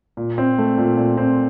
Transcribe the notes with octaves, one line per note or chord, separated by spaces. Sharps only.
A#2
C4
A3
A#2
A#2
C4